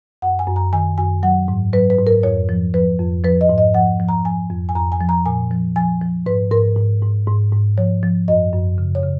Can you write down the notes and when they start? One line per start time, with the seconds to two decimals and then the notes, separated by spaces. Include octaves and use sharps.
0.22 F#2 F#5
0.39 G#5
0.47 F#2
0.56 A#5
0.73 D#3 G#5
0.98 F#2 G#5
1.23 F#3 F#5
1.48 G#2
1.73 F#3 B4
1.90 B4
1.98 G#2
2.07 A#4
2.23 F2 C#5
2.49 F3
2.74 F3 B4
2.99 F2
3.24 F3 B4
3.41 D#5
3.49 G#2
3.58 D#5
3.74 F3 F#5
4.00 F3
4.09 A#5
4.25 F3 G#5
4.50 F2
4.69 G#5
4.75 F2 A#5
4.92 G#5
5.01 F3
5.09 A#5
5.26 A#2 G#5
5.51 F3
5.76 F3 G#5
6.01 F3
6.26 G#2 B4
6.51 G#2 A#4
6.77 G#2
7.02 G#2
7.27 G#2
7.53 G#2
7.78 F3 C#5
8.03 F3
8.28 F#2 D#5
8.53 F#2
8.78 C#3
8.95 C#5
9.03 C#3